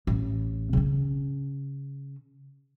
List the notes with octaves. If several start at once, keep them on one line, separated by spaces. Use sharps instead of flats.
A1
C#3 C#4